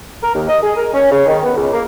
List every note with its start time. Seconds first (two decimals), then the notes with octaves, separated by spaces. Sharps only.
0.23 A#4
0.35 D#2
0.48 D#5
0.63 G#4
0.77 A#4
0.93 C#4
1.12 C#3
1.27 D#3
1.43 B3
1.56 C#2
1.72 A#3